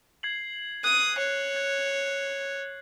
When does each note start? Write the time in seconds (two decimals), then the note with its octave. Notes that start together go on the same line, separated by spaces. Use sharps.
0.23 G#6 C7 F#7
0.84 D#6 F#6
1.18 C#5
1.56 G#6